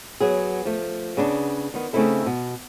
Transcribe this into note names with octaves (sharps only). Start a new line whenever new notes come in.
F#3 B3 G#4
F3 A3
C#3 B3 D4
D#3 B3
C#3 A3 C4 D#4 E4 A4
B2